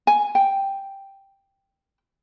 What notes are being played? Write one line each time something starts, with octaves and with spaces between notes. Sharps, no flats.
G#5
G5